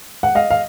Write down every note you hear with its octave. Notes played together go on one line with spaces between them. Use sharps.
F#5
D#5 F5
F5